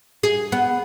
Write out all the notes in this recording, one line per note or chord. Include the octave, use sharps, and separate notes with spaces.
G#4
B3